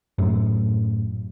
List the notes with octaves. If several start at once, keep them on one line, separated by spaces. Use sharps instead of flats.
F#2 A2